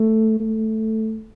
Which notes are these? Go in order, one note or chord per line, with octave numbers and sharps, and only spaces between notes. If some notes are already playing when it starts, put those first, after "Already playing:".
Already playing: A3
A3